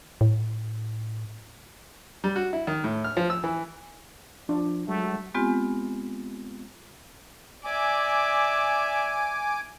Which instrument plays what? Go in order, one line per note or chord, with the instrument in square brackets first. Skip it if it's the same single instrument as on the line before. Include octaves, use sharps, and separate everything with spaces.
[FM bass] A2
[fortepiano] G3
F#4
E4
D#3
A2
F6
F3
E6
E3
[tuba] F3 [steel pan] D4
[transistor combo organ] F#3 [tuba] G#3 [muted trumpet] A3
[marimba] G#3 B3 C4 F4 G4 G#5
[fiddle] D5 E5 [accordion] G#5 D6